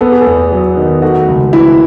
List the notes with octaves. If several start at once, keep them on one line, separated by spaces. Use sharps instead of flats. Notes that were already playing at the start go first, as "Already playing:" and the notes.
B3 A4
G#4
A4
E2
F#3
D#3
A3 F#4
C#2
E3 E4